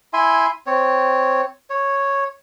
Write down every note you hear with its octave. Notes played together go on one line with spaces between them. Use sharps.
E4 E5 G#5 C6
C4 C#5
C#5